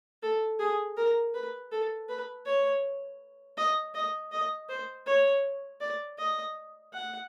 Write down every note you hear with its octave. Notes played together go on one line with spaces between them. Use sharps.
A4
G#4
A#4
B4
A4
B4
C#5
D#5
D#5
D#5
C5
C#5
D5
D#5
F#5